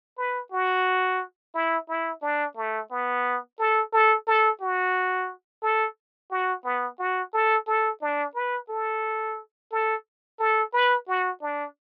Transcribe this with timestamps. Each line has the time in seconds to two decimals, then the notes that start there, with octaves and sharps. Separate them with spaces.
0.18 B4
0.52 F#4
1.54 E4
1.89 E4
2.22 D4
2.57 A3
2.91 B3
3.59 A4
3.93 A4
4.27 A4
4.61 F#4
5.63 A4
6.31 F#4
6.65 B3
6.99 F#4
7.34 A4
7.67 A4
8.01 D4
8.35 B4
8.69 A4
9.72 A4
10.39 A4
10.73 B4
11.08 F#4
11.42 D4